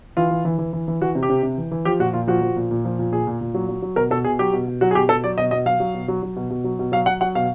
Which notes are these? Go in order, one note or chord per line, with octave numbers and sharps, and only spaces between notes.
E3 F4
E3
E3
E3
E3
E3
E3 F#4
C3
G4
C3
C3
E3
E3
F3 G4
A#2 F#4
A#2 F4
F3 F#4
F3
A#2
A#2
F3
A#2
A#2 G#4
A#2
A#2
F#3
F#3
F#3
B2 A#4
B2 A4
B2 G#4
F#3 G4
B2
B2
F#3 F#4
G#4
B2 G4
B2 A4
F#3 D5
B2 D#5
B2 D#5
F#3 F5
F#3
B2
F#3
F#3
B2
B2
F#3
B2
F#3 F5
F#3 F#5
F#3 F#5
B2 F5